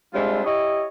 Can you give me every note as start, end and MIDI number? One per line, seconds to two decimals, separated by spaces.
0.13 0.45 55
0.13 0.45 56
0.13 0.45 60
0.13 0.45 62
0.13 0.45 64
0.13 0.45 65
0.45 0.87 64
0.45 0.87 67
0.45 0.87 73
0.45 0.87 75